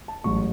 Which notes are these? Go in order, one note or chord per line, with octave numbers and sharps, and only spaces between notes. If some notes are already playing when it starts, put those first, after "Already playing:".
A5
A1 G#2 F#3 C#6